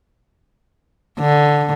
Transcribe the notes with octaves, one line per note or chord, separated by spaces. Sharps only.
D3